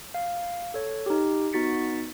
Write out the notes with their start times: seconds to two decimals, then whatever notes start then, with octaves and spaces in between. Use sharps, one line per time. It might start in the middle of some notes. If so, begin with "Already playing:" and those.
0.14 F5
0.74 A4 C#5
1.06 D#4 G4
1.53 B3 D#4 F#4 A6 B6 C#7